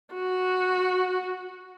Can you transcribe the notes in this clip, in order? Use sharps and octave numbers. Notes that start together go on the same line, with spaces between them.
F#4